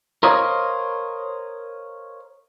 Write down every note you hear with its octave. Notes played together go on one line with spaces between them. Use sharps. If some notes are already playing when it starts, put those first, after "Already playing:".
A#4 C5 C#5 D#5 F5